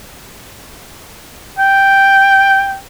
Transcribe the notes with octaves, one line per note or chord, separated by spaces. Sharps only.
G5